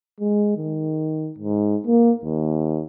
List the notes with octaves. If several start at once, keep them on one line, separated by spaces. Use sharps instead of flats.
G#3
D#3
G#2
A#3
D#2